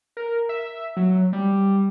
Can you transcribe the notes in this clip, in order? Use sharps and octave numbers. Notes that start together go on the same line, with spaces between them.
A#4
E5
F#3
G3